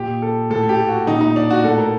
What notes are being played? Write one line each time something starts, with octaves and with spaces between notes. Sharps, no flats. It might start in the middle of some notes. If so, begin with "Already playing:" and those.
Already playing: A#2 G4
A4
A2 A4
G4
F#4
A#2 D#4
D#4
D4
F#4
A2 A4
A#4